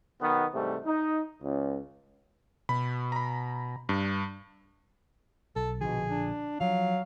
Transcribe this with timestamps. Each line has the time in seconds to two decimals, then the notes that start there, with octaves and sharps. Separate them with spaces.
0.21 B1 D#3 B3
0.54 G#2 C3 E3 G3 A3
0.85 D#4
1.42 C#2
2.69 B2 B5
3.12 A#5 B5
3.89 G2
5.56 B1 A4
5.81 A#1 B2 D3 F3 G#4
6.09 D4
6.61 F3 F#3 F5